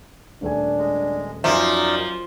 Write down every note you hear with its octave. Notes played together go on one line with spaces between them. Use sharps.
D#1 A3 D4 G#5
G#3
F#2 F3 D#4 A#4 D5 E5 G#5